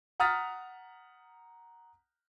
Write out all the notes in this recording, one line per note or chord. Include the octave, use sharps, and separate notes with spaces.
F#5 A#5 D#6 F6 A6 B6